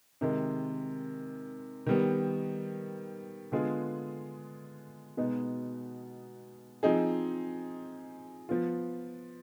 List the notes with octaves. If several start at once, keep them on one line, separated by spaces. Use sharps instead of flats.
C3 D#3 G#3
D#3 G3 B3
D3 G#3 B3 F4 G#4
B2 G#3 B3 D#4
F3 C4 D#4 G#4
F3 B3 F4